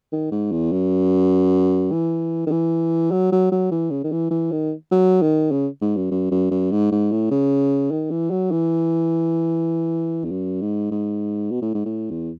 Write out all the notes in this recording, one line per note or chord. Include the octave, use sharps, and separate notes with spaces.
D#3
G#2
E2
F#2
E3
D#3
E3
F#3
F#3
F#3
E3
C#3
D#3
E3
E3
D#3
F#3
D#3
C#3
G#2
F#2
F#2
F#2
F#2
G#2
G#2
A2
C#3
D#3
E3
F#3
E3
E2
F#2
G#2
G#2
B2
A2
G#2
A2
E2